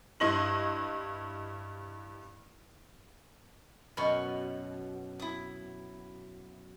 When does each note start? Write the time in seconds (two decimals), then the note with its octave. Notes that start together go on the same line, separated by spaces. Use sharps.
0.20 G2 E4 D#5 C6 A#6 F#7
3.97 F#2 B2 B5 C#6
5.20 E4 D#6